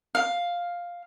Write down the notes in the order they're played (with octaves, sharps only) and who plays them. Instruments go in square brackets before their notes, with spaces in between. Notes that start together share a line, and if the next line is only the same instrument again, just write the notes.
[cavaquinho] F5